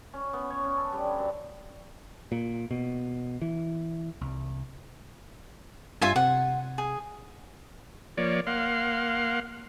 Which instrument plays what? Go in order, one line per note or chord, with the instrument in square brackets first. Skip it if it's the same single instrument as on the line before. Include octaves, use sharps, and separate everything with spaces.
[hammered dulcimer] C#4
B3
C#5
C#4
A4
G3
D3
F#2
[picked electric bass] A#2
B2
E3
C2
[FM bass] G2 [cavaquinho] F4 E5 G#5
[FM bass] C3 [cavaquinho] F#5
[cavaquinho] G#4
[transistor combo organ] F3 A#3 C#5 D5
A#3 F5 F#5 C6